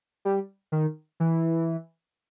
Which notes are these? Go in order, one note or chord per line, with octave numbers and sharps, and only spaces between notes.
G3
D#3
E3